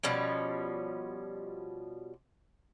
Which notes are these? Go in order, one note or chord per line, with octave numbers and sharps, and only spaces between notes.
B2 F3 G3 C#4